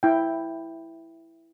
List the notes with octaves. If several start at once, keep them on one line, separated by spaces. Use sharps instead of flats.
E4 G5